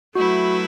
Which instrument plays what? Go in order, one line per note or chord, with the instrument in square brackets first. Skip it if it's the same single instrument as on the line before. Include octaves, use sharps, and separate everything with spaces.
[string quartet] F#3 A3 E4 B4 [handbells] F#4